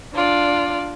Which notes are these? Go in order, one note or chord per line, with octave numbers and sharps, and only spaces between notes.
D4 F4 D5